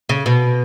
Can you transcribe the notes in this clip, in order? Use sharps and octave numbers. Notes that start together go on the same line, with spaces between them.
C#3
B2